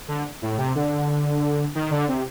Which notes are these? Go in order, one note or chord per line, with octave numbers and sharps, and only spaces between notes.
D3
A2
C3
D3
D#3
D3
C3